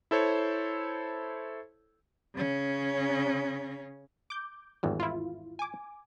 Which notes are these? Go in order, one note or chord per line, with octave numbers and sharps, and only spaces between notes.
E4 A4 C5 C#5
C#3 C#4
D6 G6
G#1 E2 G2
E4 F4
G#5 D6